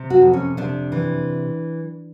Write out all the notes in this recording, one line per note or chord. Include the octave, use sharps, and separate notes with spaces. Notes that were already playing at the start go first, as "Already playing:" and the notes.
Already playing: C3
F#4
F2
C#4
C3 D4
E3